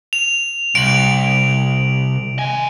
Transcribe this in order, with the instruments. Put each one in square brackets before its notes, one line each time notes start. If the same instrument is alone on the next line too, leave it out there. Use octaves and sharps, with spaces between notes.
[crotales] F7
[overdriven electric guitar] C2 [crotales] D7 F7 F#7
[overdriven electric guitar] D#3 G#5